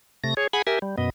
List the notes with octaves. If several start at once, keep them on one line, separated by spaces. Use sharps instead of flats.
C3 A3 A#6
G#4 C#5
G#4 F#5 G#5 B5
G4 A#4 E5 G#5
G3
F#2 B2 B3 D#5